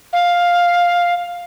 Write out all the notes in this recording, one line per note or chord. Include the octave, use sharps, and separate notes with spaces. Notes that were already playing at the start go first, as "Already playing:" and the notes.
F5